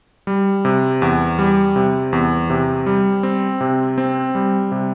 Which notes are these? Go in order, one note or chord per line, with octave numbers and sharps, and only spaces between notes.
G3
C3
E2
G3
C3
E2
C3
G3
C4
C3
C4
G3
C3